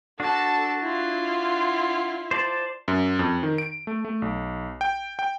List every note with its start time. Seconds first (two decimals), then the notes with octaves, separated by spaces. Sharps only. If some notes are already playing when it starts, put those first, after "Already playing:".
0.20 D4 F#4 A4 A5
0.82 E4 F4
2.31 C5 D5 A5
2.88 F#2
3.19 F2
3.43 D#3
3.58 D7
3.87 A3
4.05 A3
4.22 B1
4.81 G5
5.19 G5